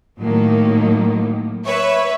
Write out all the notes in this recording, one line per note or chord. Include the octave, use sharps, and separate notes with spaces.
A2 D#3 F#3 A#3
B4 C#5 E5